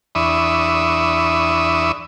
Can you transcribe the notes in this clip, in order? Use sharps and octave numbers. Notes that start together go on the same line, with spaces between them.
E2 D4 E5 B5 C#6 D#6